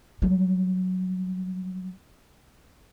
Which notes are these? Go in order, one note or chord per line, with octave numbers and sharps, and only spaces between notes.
F#3 G3